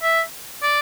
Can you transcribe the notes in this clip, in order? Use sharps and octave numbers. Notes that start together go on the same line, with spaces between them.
E5
D5